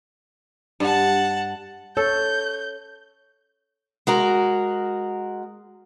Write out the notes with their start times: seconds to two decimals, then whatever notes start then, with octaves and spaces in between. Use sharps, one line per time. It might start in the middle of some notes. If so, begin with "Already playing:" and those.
0.80 G2 F#5 A5
1.97 A4 C#5 G6
4.07 G#3 F#4 A#4